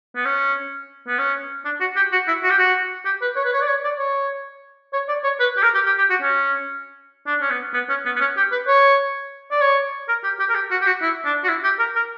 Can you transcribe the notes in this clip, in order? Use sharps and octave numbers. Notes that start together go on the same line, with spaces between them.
B3
C#4
B3
C#4
D4
F#4
G4
F#4
E4
F#4
G4
F#4
G4
B4
C#5
B4
C#5
D5
C#5
D5
C#5
C#5
D5
C#5
B4
G4
A#4
G4
G4
G4
F#4
C#4
D4
C#4
B3
B3
C#4
B3
B3
C#4
G4
B4
C#5
D5
C#5
A#4
G4
G4
A#4
G4
F#4
G4
F#4
E4
D4
F#4
E4
G4
A#4
A#4